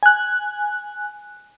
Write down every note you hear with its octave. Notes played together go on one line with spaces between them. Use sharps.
G#5 F#6